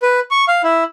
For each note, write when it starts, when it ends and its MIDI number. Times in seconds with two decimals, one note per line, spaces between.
0.03 0.20 71
0.31 0.45 85
0.48 0.62 77
0.64 0.84 64